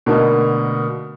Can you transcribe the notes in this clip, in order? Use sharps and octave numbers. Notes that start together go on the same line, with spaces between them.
B2 D3 A3 A#3 D#4 A#4